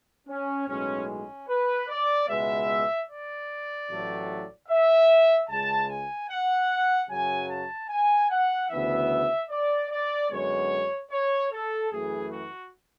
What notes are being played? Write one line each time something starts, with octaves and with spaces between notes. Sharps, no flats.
C#4
B1 A2 G#3 C#4
C#4
B4
D5
C#2 B2 G#3 B3 E5
D5
A1 A2 F#3 A3
E5
C#2 C#3 G#3 A5
G#5
F#5
F#2 C#3 F#3 G#5
A5
G#5
F#5
D2 C#3 E3 B3 E5
D5
D5
F#2 D3 G#3 B3 C#5
C#5
A4
F#2 E3 A3 G#4
F#4